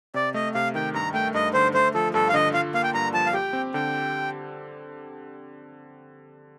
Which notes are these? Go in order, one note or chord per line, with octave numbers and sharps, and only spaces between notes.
C3 D5
A3 D#5
C3 F5
D#3 G5
G2 A#5
A3 G5
G2 D#5
D3 C5
A3 C5
F3 A4
G2 A4
F5
D3 D#5
F4 F5
A#3 F5
G5
G2 A#5
F3 A5
F5
G4 G5
C4
D3 G5